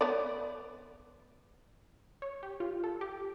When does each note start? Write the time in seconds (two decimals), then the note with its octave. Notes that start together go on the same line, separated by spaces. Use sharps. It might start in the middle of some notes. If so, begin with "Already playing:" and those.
0.01 B3 C#5 D5
2.22 C#5
2.43 G4
2.60 F4
2.84 A4
3.01 G4